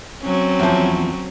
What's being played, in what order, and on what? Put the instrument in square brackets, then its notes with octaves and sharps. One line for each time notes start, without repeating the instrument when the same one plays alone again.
[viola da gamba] F#3 C4 C#4
[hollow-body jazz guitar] E2 F3